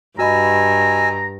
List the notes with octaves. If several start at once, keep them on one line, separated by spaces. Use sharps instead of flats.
G2 F#4 D#5 G#5 A#5 B5 E6